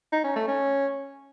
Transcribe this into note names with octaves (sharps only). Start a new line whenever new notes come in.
D#4
C#4
A3
C#4